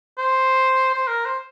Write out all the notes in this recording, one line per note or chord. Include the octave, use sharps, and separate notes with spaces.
C5
C5
A#4
C5